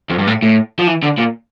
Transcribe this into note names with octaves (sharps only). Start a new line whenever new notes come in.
F2
G2
A2
A2
F3
E3
D3
A#2